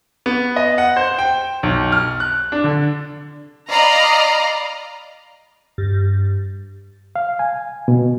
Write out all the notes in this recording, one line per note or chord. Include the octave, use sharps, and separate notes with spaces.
B3
D#5
F#5
C5
G5
B1
F6
F#6
D4
D3
D5 D#5 F5 A#5 B5
G2
F5
G#5
B2